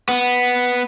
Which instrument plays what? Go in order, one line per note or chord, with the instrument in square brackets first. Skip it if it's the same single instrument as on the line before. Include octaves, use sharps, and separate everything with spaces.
[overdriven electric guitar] B3